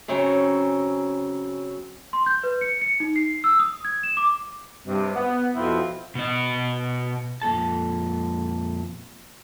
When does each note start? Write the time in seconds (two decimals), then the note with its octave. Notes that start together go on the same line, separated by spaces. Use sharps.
0.08 C#3 F#3 C4 C#4 A#5
2.13 C6
2.26 G6
2.43 B4
2.61 C#7
2.81 C#7
3.00 D#4
3.16 C7
3.44 E6
3.60 D#6
3.85 G#6
4.03 E7
4.17 D6
4.87 G2 C3
5.15 B3
5.56 F2 B2 F3 C4 E4
6.15 B2 D#5
7.42 F2 A#2 A4 A5